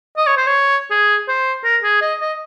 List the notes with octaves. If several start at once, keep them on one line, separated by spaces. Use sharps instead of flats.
D#5
C#5
C5
C#5
G#4
C5
A#4
G#4
D#5
D#5